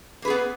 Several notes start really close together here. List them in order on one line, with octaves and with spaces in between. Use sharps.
A#3 B4 G#4 B3